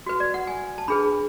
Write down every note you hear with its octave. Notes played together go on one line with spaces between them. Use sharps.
F#4 B4
D5
F#5
G#5
A5
D4 G#4 B4 B5